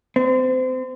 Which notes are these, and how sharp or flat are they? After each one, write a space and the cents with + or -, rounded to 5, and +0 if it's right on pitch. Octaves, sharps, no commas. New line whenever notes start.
C4 -30